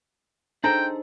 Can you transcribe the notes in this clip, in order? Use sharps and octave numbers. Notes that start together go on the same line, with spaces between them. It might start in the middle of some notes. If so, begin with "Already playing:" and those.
D4 D#4 G#4 A4 C5 G5 A#5